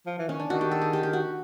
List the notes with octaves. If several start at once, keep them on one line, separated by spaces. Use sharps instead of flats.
F3
E3
D#3 C#4
D4
D#3 F#4
G4
A4
G#4
G4
G4
F#4